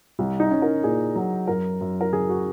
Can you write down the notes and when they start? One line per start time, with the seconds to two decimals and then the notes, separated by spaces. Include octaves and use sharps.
0.19 C2
0.40 D#4
0.51 C#4
0.62 A#4
0.84 A#2 G#4
1.16 F#3
1.48 F#2 A#4
1.81 F#2
2.01 A#4
2.13 C#3 G#4
2.29 F#4